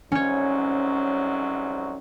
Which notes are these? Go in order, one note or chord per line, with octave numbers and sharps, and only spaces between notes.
C2 G#2 F#3 C#4 C#5